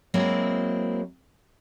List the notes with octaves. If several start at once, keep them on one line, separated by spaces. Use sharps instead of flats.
F#3 G#3 A#3 C4 E4